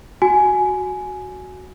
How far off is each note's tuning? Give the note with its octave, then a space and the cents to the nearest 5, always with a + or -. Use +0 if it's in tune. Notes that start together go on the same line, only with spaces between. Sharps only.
F#4 +0 G#5 +10